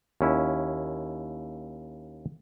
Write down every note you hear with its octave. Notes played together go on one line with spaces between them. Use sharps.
D#2 C#4 E4